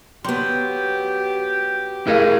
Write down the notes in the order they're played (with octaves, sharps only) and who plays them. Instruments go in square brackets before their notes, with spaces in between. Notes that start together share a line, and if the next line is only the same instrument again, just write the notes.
[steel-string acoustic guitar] F#3 B3 [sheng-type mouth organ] G4 [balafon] C6
[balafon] A3 A#4 F5 [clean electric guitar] E4 G#4 D#5